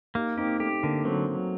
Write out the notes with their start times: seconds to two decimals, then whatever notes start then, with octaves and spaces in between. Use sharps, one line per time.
0.15 A#3 D#4 G4
0.37 C4 D#4 G4
0.60 A3 G4
0.83 D3 A#3
1.05 F#3 A3 C4